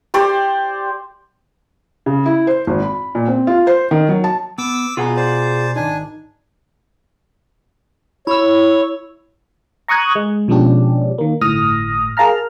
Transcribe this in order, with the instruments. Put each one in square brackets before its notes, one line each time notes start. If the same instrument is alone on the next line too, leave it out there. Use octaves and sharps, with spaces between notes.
[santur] G4 C5 D5
[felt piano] C#3
E4
C5
G#1
B5
A#2
C4
F4
C5
D#3
F#3
A5
[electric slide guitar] B3 [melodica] D6 E6
[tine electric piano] B2 G#5 A#5 [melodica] B3 [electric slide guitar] F4 G#4 F#5
[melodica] C5 D5
[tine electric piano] G#1 D#4 [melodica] D4 G#5
[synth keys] E4 E6 [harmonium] C#5
[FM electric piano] A#5 C#6 D#6 F#6 G#6
G#3
B2 F3 G#3 C#4 D4 G4
D#3 A#3
G1 A2 D#6 F6 A#6
G#4 A#4 F5 A5 A#5 F6